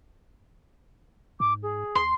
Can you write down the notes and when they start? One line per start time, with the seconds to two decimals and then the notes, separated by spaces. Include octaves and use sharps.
1.40 G#2 D6
1.63 G#4
1.95 D#2 C6